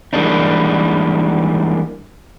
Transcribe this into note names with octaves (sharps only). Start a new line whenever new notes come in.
E3 G3 G#3 A#3 D4 D#4